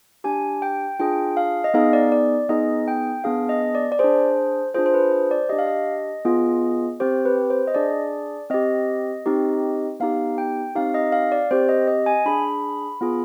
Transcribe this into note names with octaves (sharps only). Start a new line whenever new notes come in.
D4 G4 G#5
G5
D4 F4 G#4 G5
F5
D#5
B3 D#4 G#4 F5
D5
D5
B3 D#4 G#4 D#5
G5
B3 D4 G#4 F5
D#5
D5
D5
D4 G#4 C5
D4 F4 G#4 C5
C5
B4
C5
D5
D4 G4 D#5
F5
D#5
B3 F4 G#4
C4 G4 C5
B4
C5
D#5
D4 G#4 D5
C4 G4 D#5
C4 D#4 G4
B3 D#4 G4 F5
G5
C4 D#4 G4 F5
D#5
F5
D5
C4 G4 C5
D#5
D#5
G#5
D4 G#4 B5
B3 F4 G#4